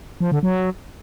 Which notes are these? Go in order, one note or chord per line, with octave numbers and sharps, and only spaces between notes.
F3
D3
F#3